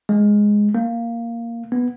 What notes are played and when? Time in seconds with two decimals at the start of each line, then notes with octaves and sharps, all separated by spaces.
0.09 G#3
0.75 A#3
1.72 B3